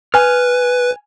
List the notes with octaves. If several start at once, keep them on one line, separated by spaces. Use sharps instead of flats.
B4 G#5 F6